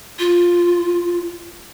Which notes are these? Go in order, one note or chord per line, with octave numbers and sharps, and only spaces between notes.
F4